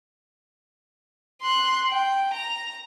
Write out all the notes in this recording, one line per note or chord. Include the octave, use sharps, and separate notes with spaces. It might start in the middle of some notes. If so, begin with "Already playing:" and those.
C6 F#6
G5
A#5